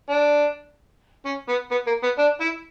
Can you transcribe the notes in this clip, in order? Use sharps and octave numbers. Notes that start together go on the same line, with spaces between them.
D4
C#4
B3
B3
A#3
B3
D4
E4